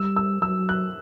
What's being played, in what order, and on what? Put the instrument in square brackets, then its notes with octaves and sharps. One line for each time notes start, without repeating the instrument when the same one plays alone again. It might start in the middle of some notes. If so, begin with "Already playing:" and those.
Already playing: [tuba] G3 [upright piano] E6
[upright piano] E6
[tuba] F#3 [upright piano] E6
[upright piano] F#6